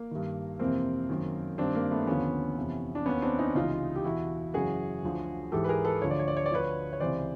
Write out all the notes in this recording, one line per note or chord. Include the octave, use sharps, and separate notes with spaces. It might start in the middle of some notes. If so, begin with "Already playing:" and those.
Already playing: A#3
G2 D#3
F2 C3 E3 A#3 C4
F#2 D#3
G2 D#3 C4 D4
A#3
A3 B3
D#2 D3 F3 B3 C#4
F2 C3 E3
D4
D#2 D#3 B3 C#4
C4 D4
C#4 D#4
C#2 C3 E3 D#4 F4
G4
E2 B2 E4 F#4
F#2 C#3 E3 F#4 G#4
D2 D3 F3
G#2 E3 G4 A4
B4
G#4 A#4
A4 B4
D2 D3 F3 C#5
D5
C#5
D5
C#5
D5
D2 D3 F3 B4 C#5
C#5
C#2 C3 E3 C5 D5